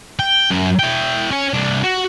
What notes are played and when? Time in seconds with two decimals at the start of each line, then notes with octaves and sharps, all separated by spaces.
0.19 G5
0.50 F#2
0.79 E4 G5
1.31 C#4 C#5
1.53 C2 D4
1.84 F#4